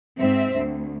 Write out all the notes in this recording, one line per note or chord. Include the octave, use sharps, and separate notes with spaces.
G#2 C4 E5
D2